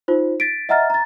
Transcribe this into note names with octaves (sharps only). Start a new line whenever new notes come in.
D#4 F4 C5
A6 B6 D7
D#5 E5 F#5 A#5 F6 A6
A#5 A6